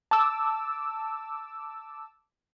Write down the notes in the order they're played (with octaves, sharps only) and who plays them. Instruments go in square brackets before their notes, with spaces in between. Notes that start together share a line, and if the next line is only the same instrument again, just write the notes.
[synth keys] A5 D6 E6